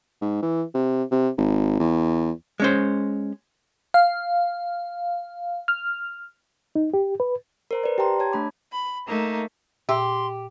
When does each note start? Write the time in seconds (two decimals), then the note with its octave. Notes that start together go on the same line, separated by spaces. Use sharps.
0.22 G#2
0.42 E3
0.75 C3
1.11 C3
1.38 G#1
1.80 E2
2.60 G#3 C#4 C5
3.94 F5
5.68 F6
6.76 D#4
6.94 G4
7.20 B4
7.71 A#4 C5 A#5
7.83 B4 D5
7.98 G4 G5 A5 A#5 C6
8.19 C#5 A5 G#6
8.33 A3 D4 B5 D6
8.72 B5
9.06 A3 A#3 D#4
9.89 A#2 G4 E5 C6 E6